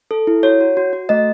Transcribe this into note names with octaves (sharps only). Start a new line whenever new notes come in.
A4
E4
F#4 C#5
F#4
F#4
F#4
A3 D#5